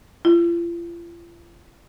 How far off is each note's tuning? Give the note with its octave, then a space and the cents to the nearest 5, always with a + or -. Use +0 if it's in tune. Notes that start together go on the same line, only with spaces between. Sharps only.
F4 -40